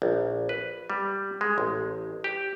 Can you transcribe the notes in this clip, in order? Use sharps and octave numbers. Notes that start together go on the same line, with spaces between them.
A#1
B4
G3
G#3
A1
G4